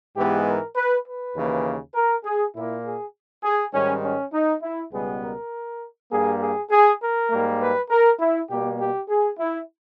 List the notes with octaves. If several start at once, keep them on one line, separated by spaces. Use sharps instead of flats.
G#2 E3 G#3 B3 G4
A#4
B4
B4
D#2 C#3 E3 A#3
A#4
G#4
A#2 A#3 E4
G#4
G#4
G#2 D#3 G3 C#4
C#4
D#4
E4
C#2 B2 G3 B3 G#4
A#4
G2 G3 A#3 G#4
G#4
G#4
A#4
G#2 G3 A#3
B4
A#4
E4
B2 G3 A#3 G4
G4
G#4
E4